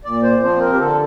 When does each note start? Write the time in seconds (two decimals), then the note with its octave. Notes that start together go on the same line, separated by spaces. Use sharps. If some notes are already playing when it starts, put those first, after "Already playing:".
0.04 A#2 D5
0.23 C5
0.41 F3 C4 C5
0.61 A#4
0.73 G4
0.79 D3 A4